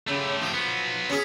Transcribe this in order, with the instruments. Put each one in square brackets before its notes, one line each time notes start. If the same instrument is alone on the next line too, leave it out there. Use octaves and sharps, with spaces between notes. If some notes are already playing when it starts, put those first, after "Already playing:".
[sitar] C#3 [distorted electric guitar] A3 G4
[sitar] F3
[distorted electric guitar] F#3 B3
[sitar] C#4 G#4